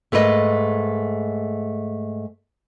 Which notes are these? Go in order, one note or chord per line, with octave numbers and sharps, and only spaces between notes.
G#2 A3 A#3 B4 D#5